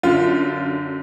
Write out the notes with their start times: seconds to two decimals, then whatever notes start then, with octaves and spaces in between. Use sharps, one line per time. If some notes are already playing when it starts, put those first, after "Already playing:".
0.03 F#2 D3 F4